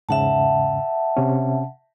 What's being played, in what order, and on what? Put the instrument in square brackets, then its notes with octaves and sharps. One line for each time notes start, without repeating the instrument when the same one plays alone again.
[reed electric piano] E2 G#2 C#3 [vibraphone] E5 F#5 A5
[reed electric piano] C3 C#4